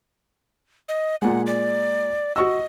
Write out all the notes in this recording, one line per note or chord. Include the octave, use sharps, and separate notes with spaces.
D#5
A#2 G#3 F#5
D5
F#4 D#5 C#6 E6